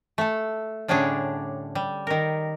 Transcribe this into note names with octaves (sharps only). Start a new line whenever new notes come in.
A3 A4
A2 D3 G3 C#4 D4 G#4
G3
D#3 A#4